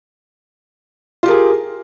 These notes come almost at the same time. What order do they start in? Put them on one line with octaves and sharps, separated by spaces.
F4 G4 A#4 G#4